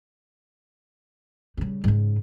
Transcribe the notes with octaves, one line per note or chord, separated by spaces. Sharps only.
C#3 G3
G#2 C#3